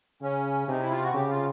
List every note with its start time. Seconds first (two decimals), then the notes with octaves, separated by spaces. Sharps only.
0.22 C#3 C#4
0.68 C3 D#4
0.80 E4
0.92 F4
1.03 F#4
1.14 C#3 G4
1.30 F4